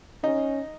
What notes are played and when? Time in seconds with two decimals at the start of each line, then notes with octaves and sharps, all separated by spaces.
0.23 C#4 D#4